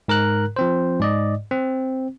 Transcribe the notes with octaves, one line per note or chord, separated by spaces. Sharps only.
G#2 A#4 A#5 F#6
F3 C4 C5
G#2 D5 D#5
C4